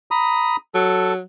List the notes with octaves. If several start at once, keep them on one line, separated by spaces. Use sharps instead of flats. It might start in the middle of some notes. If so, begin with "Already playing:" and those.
A#5 B5 D#6
F#3 A4